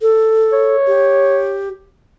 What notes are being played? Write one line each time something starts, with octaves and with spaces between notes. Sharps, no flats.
A4
C#5
G4